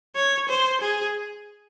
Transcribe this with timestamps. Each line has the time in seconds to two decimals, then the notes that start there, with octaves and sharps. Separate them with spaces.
0.16 C#5
0.49 C5
0.81 G#4